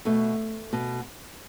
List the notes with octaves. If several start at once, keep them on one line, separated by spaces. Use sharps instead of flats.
B2 A3
B2